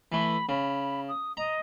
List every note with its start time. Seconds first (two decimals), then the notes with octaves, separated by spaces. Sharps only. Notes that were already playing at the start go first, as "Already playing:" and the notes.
0.12 E3 A3 B5
0.49 C#3 B5
1.08 D#6
1.37 D#5 A#5